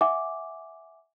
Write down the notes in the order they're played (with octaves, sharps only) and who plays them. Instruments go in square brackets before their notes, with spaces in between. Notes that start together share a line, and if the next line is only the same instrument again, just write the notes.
[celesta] E5 F#5 G#5 D6